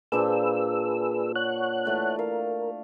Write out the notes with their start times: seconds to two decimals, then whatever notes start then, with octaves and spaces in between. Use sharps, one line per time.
0.12 A#2 D4 G#4 B4 C5 E6
1.36 C#5 F#5 F#6
1.85 E3 A3 D5
2.19 A#4 F5